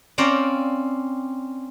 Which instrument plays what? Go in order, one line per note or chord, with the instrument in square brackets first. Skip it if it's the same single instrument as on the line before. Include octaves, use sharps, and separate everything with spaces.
[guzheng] C4 C#4 D5 F5 G5 A#5